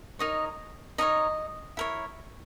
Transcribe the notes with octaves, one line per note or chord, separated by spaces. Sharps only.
D#4 A#4 C#5 D#5
D#4 A#4 C#5 D#5
E4 A#4 C#5